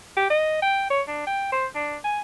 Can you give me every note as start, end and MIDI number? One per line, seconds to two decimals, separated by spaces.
0.17 0.29 67
0.30 0.60 75
0.62 0.87 79
0.90 1.02 73
1.08 1.23 62
1.27 1.52 79
1.52 1.66 72
1.75 1.96 62
2.04 2.21 80